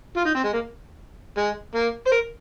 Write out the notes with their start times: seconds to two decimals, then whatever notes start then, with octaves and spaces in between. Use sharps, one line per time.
0.17 F4
0.25 D#4
0.35 C4
0.44 G#3
0.54 A#3
1.38 G#3
1.75 A#3
2.07 C5
2.12 A#4